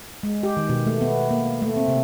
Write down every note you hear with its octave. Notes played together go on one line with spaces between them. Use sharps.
G#3
G4
D#3
B2
A3
B3
A#3
A3
C4
C3